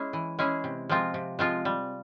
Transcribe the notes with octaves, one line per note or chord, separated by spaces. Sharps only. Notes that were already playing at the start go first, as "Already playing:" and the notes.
Already playing: G#3 C#4 E4 G#4
E3
G#3 C#4 E4 G#4
C3
F3 G#3 C4 F4
C3
F3 G#3 C4 F4
G3